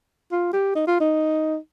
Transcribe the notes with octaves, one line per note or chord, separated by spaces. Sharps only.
F4
G4
D#4
F4
D#4